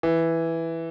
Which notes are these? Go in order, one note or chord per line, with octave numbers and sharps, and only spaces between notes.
E3